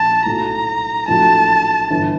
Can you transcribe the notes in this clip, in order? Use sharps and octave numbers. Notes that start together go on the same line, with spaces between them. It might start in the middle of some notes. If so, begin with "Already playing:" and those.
Already playing: A#1 A#2 A5
B1 A2 F#3 A#5
A#1 A2 F#3 A5
G1 G2 E3